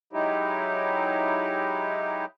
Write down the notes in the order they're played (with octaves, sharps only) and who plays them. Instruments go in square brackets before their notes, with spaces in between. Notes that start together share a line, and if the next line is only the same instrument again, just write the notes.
[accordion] F#3 G#3 D#4 E4 G4